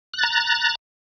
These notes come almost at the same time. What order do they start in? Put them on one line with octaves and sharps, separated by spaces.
F#6 A6 A#5